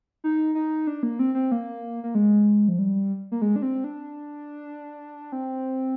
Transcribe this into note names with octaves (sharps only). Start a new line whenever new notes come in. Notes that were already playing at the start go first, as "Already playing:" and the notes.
D#4
D#4
D4
A#3
C4
C4
A#3
A#3
G#3
F3
G3
A#3
G#3
D4
C4
D4
C4